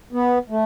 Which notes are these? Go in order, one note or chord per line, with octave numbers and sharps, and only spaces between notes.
B3
A3